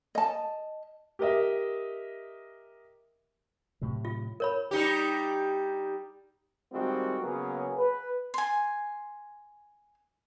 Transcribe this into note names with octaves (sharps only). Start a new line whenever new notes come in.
D#5 A5
G4 A#4 D#5 E5
A2 C3 F#3
F4
A#4 C#5 B5
G3 D#4 G4
D#3 G3 G#3 C4 F4 F#4
C#3 F#3 A#3 B3 G#4
B4
G#5 C6